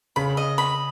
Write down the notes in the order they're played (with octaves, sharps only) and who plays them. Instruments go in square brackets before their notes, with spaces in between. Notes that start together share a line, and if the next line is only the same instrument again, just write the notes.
[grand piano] C#3 [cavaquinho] B5
[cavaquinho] D#5
B5